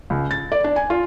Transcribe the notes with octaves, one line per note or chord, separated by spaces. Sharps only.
C#2
A6
D5
D4
G#5
F4